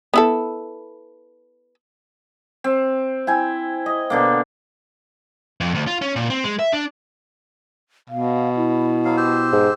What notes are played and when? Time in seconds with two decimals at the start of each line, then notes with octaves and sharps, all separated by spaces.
0.14 B3 E4 A4
2.64 C4
3.27 E4 G5 G#5
3.86 D#5
4.10 B2 D3 A#3
5.61 F2
5.75 D2
5.87 F4
6.02 C#4
6.16 A#2
6.30 C4
6.44 G#3
6.59 E5
6.73 D4
8.10 B2 F5
8.56 E4
9.05 F#3 F5
9.17 G4 C5 E6
9.52 G#2